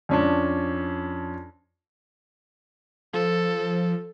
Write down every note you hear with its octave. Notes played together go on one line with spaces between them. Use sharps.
F2 C#4 D4
F3 A4